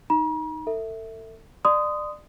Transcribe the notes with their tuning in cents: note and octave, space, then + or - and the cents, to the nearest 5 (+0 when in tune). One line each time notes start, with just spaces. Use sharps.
D#4 +0 A#5 +45
A4 +35 E5 -10
D5 +30 C6 -30 D#6 +0